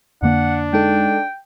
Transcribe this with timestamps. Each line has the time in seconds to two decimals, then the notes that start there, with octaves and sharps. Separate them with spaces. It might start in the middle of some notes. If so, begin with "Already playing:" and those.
0.22 F2 D3 A#3 D4 F#5
0.73 G#3 D#4 A4 G5